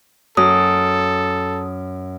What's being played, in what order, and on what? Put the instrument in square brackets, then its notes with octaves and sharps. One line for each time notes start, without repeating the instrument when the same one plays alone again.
[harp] F#2 [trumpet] A4 [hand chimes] D#6